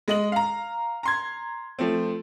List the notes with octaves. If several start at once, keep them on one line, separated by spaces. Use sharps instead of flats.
G#3 D#5 F#7
F5 A#5
A#5 C6 G#6
F3 A3 C4